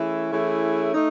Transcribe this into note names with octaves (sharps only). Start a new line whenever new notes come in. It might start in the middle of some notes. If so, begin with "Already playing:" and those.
Already playing: E3 A3 C#4 E4 G#4
E3 A3 C#4 E4 G#4
A3 D#4